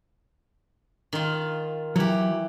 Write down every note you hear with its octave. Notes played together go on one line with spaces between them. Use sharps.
D#3 F4
E3 F#3 G4